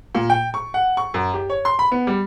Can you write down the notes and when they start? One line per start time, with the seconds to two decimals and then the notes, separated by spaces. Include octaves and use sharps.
0.15 A#2
0.30 G5
0.54 C#6
0.74 F#5
0.97 C#6
1.14 F#2
1.34 G4
1.50 C#5
1.65 C6
1.79 B5
1.92 B3
2.07 G3